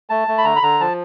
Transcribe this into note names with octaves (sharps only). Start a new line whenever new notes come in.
A3 A5
A3
B5
D3 A#5
B5
D3 A#5
F3 A5